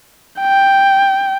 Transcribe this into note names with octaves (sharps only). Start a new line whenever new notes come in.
G5